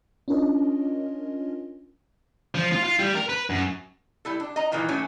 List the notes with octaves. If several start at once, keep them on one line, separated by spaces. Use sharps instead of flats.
C#4 D4 F4 A#4 C#5 D#5
F3
F4
F4
G3
A#4
B4
F#2
G3 E4 A4
D4
D#5 A#5
A#2 D#3 E3 G#3 A#3
D#3 F#3 A3 C#4 D4